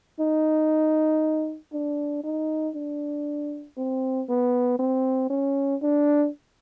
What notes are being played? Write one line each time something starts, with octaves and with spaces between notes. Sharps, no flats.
D#4
D4
D#4
D4
C4
B3
C4
C#4
D4